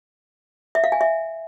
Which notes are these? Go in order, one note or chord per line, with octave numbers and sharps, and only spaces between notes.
E5
F5
G#5
E5